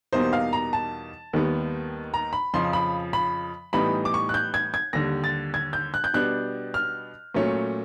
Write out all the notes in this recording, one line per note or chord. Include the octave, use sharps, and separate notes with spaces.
E2 B2 G3 A#3 D#4 C5
F5
A#5
A5
D#2 D#3 G3 B3
A#5
B5
F2 C#3 F3 C6
B5
B5
A2 E3 G3 B3 D#4 B5
D6
C#6
F#6
G6
G#6
G#6
D#2 D3 G3 A#6
A6
G#6
G6
F#6
G6
B2 G3 B3 D4 F#6
F6
A#2 F#3 A3 C#4